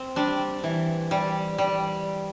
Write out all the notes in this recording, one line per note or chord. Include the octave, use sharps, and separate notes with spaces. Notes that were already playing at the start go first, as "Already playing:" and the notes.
Already playing: C4
G3 D4
E3
G3
G3